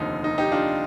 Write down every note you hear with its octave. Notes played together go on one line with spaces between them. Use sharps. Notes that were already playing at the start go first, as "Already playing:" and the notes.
Already playing: F1 D#2 D3 F3 D#4
D#4
D#4 G4
D4 F4